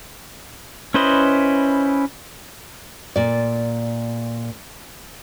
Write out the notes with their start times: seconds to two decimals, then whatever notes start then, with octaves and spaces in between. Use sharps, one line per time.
0.94 C#4 E4 B4 C5 D#5
3.16 A#2 D5